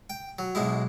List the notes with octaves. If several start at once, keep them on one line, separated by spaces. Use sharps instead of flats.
G5
F#3
B1 B2 G#3 E4